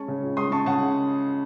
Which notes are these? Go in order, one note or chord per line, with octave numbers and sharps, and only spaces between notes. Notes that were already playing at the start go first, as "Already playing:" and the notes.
Already playing: G#3 C#4 A5 C#6
C#3
C#2
G#3 C6 D#6
C#4 A5 C#6
C#3 F#5 A5